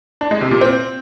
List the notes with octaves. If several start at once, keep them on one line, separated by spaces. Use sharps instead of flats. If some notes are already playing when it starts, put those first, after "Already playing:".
D4
G#3
C3
A#2
C4